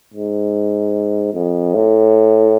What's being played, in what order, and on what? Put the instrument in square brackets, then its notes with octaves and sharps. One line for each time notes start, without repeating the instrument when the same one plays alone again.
[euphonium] G#2
F2
A2